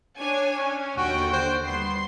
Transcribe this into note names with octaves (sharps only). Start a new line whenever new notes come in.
D4 C#5 G#5
C#4
D#2 D3 F#4 G5
C5
G3 B3 C6 C7